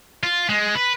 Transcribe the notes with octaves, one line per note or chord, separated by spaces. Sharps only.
F4
G#3
B4